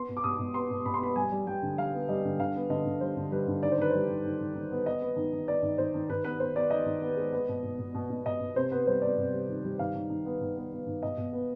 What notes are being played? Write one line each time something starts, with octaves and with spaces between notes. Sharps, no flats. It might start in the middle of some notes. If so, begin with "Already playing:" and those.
Already playing: B3 C6
B2
D6
B2 D#6
B2
B3 C6
B2
B2 B5
C6
B3 B5
G3 G#5
G3
G3 G5
D3
G3 F5
B3
G3 D#5
D3
D3 F5
B3
D3 D#5
D3
G3 C5
D3
G3 B4
D3
D#3 D5
C5
D#3 B4
G3 C5
D#3
D#3
D#3
D#3
B3
B3 D#5
B3
D#3
D#3
B3 D5
D#3
D#3 C5
D#3
D#3 B4
B3 B4
B3 C5
B3 D5
D#3 D#5
D#3
B3
G#3
B3
B2
B2
B2
B2
B2
B2 D#5
B2
C3 C5
B3 B4
G3 C5
B3 D5
C3
G3
D#3
G3
D#3 F5
D#3
D#3
B3
D#3
B3
B3
D#3
B2 D#5
B2
B3